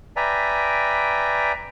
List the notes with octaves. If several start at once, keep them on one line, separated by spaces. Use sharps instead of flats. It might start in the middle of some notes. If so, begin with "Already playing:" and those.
B4 D5 E5 G5 G#5 A#5